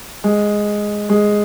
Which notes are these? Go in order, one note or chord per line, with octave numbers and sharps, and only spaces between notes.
G#3
G#3